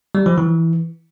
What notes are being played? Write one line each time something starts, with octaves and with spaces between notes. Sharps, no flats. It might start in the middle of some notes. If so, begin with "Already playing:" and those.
G3
F3
E3